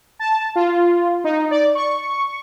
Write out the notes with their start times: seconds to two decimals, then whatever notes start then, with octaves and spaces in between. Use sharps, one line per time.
0.19 A5
0.56 F4
1.24 D#4
1.51 D5
1.75 C#6